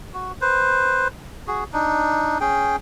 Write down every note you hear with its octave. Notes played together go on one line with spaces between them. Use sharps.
F#4
B4 C5
F#4 G#4
D4 D#4
C#4 G#4 G5